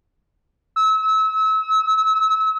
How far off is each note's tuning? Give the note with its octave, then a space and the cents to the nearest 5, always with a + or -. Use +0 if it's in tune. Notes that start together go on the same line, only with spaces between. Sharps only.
E6 -35